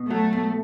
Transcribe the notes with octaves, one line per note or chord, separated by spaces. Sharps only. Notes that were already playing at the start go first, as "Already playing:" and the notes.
Already playing: B2
F#3 A3
B2